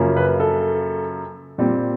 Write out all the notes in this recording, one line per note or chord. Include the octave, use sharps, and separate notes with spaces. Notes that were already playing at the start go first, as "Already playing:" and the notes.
Already playing: F#2 C#3 F3 A#3 C#4
B4
A4
A#2 G3 C4